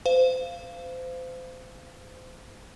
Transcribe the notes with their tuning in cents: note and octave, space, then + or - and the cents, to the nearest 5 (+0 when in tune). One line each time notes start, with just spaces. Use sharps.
C5 -30 F5 -15